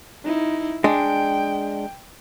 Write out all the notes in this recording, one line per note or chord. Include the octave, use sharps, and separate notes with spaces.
D#4 E4
G#3 D4 G5